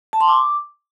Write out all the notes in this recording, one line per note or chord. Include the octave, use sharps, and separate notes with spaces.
A5
C6
D6